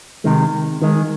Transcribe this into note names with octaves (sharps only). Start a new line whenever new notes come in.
C3 D#3 G#3
D#3 G#3